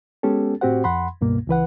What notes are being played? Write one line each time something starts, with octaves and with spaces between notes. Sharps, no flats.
G#3 B3 C#4 G4 A4
A2 C4 F#4 G4 C5 F#5
F2 F#5 B5 C6
C#2 G2 B2 A#3
C#2 E3 B4 F#5